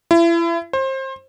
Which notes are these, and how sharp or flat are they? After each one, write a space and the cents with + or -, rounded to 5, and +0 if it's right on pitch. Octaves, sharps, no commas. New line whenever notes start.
E4 +35
C5 +30